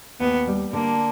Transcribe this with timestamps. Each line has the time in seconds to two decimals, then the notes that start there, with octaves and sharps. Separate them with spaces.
0.20 D#2 B3
0.47 G3
0.73 D3 A#3